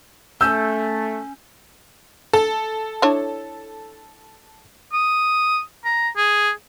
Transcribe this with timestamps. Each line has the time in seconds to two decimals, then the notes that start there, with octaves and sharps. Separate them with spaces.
0.41 A3 C#4 E6 G6
2.33 A4
3.02 D4 E4 C#5
4.93 D#6
5.85 A#5
6.17 G#4